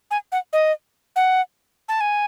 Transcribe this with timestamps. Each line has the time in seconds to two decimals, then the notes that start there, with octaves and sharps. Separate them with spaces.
0.11 G#5
0.32 F#5
0.53 D#5
1.16 F#5
1.89 A5
2.01 G#5